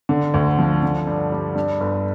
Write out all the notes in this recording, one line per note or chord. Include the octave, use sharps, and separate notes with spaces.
D3
D2
F3
D3
G2
G3
G2
G1